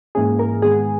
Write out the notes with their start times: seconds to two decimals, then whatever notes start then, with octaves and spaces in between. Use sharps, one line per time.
0.15 G#2 E3 A#3 C#4 G#4
0.39 A#4
0.62 G#2 D#3 G#3 B3 G#4